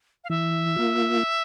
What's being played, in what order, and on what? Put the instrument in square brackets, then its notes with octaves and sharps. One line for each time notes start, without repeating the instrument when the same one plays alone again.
[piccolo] F5
[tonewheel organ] E3 [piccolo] E5
[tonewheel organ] A#3 F4